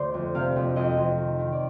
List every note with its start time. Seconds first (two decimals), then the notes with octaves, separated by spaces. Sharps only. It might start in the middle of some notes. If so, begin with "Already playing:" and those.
Already playing: D2 D3 C5 D5
0.14 F2
0.35 C3 F5
0.56 F2
0.76 F2 D#5
0.98 F2
1.18 D#3
1.39 D#3
1.52 D5